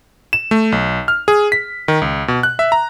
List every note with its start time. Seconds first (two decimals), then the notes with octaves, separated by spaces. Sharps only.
0.33 E7
0.51 A3
0.72 B1
1.08 F6
1.28 G#4
1.52 B6
1.88 D#3
2.02 C#2
2.28 B2
2.43 F#6
2.59 E5
2.72 A#5